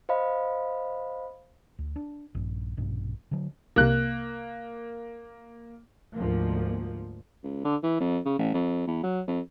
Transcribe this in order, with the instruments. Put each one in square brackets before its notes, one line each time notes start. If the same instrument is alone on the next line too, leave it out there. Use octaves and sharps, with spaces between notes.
[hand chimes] C5 D#5 F5 B5
[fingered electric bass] D2
D4
A#1 G2
A#1 G2 B2
D3 F#3
[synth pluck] C2 C3 [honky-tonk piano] A#3 F#6
[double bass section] D2 G#2 F3 A#3
[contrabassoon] C#2
D3
E3
F2
C#3
A1
F2
E2
F#3
F2